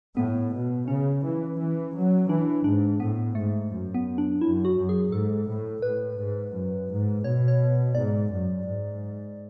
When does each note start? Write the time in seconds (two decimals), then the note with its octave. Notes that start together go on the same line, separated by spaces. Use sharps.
0.17 A2 B3
0.52 B2
0.88 C#3 C#4
1.23 E3
1.59 E3
1.94 F#3
2.29 E3 D4
2.64 G#2 D4
3.00 A2 B3
3.35 G#2 A3
3.71 F#2
3.95 B3
4.18 D4
4.41 F#2 E4
4.65 F#4
4.77 F#2
4.89 G#4
5.12 G#2 A4
5.48 A2
5.82 A2 B4
6.18 G#2
6.54 F#2
6.89 G#2
7.24 B2 C#5
7.48 C#5
7.95 G#2 D5
8.31 F#2
8.66 G#2